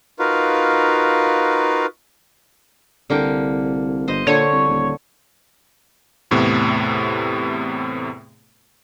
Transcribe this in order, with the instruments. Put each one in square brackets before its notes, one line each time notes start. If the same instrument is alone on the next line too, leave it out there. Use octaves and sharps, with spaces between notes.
[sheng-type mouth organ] D#4 F4 F#4 A#4 B4 F5
[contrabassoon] C2 [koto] D3 A#3 G5
[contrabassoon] G1 [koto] C5 D#5
[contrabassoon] A#2 [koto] D3 [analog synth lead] C#5
[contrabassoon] C2
D#1
[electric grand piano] E2 A2 C3 A3 B3